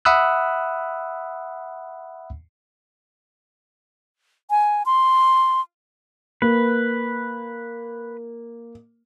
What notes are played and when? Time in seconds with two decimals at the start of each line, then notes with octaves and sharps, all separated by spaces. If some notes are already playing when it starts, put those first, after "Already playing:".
0.05 E5 F#5 B5 D#6 E6 F#6
4.50 G#5
4.86 C6
6.42 A#3 B4